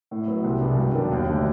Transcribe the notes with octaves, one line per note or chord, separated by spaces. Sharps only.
A2
F#3 B3
C2
B2 G#3 B3 D4
G2
D#3 F#3 B3 D4
D#2
D3 F#3 A3 D4